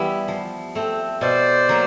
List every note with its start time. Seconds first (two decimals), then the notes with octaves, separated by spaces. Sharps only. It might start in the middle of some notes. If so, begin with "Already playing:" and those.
Already playing: E3 G3 B3 E4
0.28 F3
0.75 A3 C4
1.21 B2 C5 D5
1.69 F#3 A#3